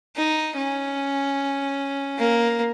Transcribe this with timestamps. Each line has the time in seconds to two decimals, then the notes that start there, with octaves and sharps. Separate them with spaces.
0.16 D#4
0.57 C#4
2.18 A#3